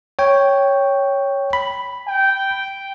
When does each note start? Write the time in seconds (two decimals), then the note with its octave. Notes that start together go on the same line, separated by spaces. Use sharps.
0.19 C#5 G5
1.53 B5
2.08 G5